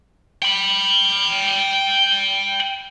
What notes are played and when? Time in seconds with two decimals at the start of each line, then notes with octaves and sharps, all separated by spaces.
0.42 G5 B5